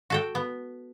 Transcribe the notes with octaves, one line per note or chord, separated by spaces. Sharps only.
F#4 A4 G5
B3